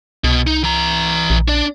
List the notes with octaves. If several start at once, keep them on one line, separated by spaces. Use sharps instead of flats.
C2 B2
D#4
E3 A#5
A#1
D4 D5